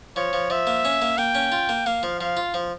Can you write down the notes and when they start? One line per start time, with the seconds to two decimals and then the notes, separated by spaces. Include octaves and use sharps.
0.16 F3 C#5
0.33 F3
0.50 F3 E5
0.67 A#3
0.85 C#4
1.02 A#3
1.18 A#3 G5
1.35 C#4
1.52 F4
1.69 A#3
1.86 A#3 F5
2.03 F3
2.20 F3 F5
2.37 F4
2.54 F3